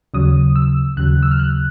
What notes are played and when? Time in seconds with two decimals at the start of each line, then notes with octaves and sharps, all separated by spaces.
0.14 D#2 C#3 F#3 D#6
0.56 E6
0.97 D#2 C#3 F#3 F#6
1.23 E6
1.31 F6
1.40 F#6